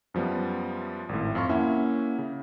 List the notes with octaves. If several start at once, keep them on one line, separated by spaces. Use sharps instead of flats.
F#2 F3 G3 B3
G#1 A2
F2 F5 C6 C#6
A#3 C#4 E4 E5 F#5
C#3